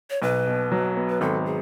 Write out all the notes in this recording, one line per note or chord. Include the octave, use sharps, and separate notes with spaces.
C#5
B1 B4
B2
F#3
B3
B4
G#1 A4
G#4